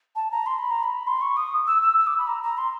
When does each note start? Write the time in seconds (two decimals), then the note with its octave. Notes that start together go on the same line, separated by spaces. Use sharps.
0.15 A5
0.31 A#5
0.46 C6
0.58 B5
0.70 A#5
0.83 B5
1.07 C6
1.21 C#6
1.36 D#6
1.67 E6
1.82 E6
1.98 E6
2.07 D6
2.18 B5
2.27 A#5
2.43 A#5
2.57 C6